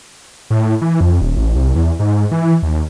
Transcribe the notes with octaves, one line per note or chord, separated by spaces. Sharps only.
A2
E3
F2
D#1
A1
C2
E2
G#2
E3
D#2